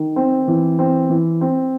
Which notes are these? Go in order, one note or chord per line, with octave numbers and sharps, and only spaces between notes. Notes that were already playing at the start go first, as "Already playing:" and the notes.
Already playing: D#3
C4
E3
C4
E3
C4